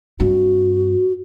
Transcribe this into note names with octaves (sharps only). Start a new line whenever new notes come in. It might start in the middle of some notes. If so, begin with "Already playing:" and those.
G2 C4 F#4